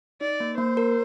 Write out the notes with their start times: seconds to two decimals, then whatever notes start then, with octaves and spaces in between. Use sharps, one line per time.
0.21 D#4 D5
0.40 A#3
0.58 A#3 C5
0.77 A#4